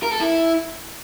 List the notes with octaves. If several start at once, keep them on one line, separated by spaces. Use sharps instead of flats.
A#4
A4
E4